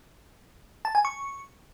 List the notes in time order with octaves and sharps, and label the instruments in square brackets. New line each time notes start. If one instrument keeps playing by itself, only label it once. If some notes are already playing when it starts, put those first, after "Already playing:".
[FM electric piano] A5
G#5
C#6